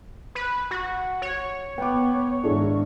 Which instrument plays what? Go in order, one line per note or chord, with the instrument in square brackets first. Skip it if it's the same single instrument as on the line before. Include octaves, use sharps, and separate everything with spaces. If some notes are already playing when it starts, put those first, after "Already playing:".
[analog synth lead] B4
F#4
C#5
[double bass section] B3 [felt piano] G5 D6
[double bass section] G#2 D#3 [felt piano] D4 E4 G#4